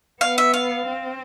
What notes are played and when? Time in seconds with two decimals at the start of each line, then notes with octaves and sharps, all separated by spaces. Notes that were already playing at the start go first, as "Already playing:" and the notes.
0.21 B3 F5
0.38 E5
0.54 F5
0.85 C4